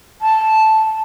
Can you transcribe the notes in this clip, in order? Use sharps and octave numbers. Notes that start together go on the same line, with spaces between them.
A5